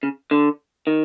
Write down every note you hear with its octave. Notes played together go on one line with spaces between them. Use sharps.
C#3
D3
D#3